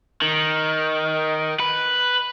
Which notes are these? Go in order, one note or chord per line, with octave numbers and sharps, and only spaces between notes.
D#3
B4